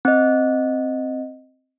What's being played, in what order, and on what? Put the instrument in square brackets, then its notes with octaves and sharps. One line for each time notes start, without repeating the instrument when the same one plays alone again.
[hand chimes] C4 D#5